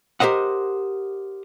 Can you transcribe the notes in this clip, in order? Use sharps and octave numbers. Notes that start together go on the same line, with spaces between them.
G4 A#4 C5 D#5 F#5